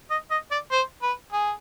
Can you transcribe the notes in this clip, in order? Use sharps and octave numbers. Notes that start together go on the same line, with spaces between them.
D#5
D#5
D5
C5
B4
G#4